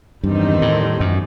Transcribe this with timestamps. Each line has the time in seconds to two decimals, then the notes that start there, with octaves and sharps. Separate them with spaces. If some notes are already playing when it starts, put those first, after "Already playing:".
0.23 E2 G2 D#3 G3 C4 D#4
0.62 A2
1.00 F#2